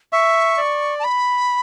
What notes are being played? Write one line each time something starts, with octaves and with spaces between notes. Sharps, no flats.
E5 C#6
D5
A5
B5